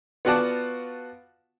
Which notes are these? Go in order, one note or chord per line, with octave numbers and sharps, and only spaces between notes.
B3 F4 F#4 D5 F#5 A5